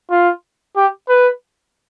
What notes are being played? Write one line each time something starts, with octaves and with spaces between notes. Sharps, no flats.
F4
G4
B4